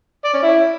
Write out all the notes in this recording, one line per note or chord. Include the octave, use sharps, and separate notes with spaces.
D5
C#4
E4